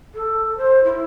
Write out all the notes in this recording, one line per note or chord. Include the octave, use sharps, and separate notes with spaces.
A4
C5
E4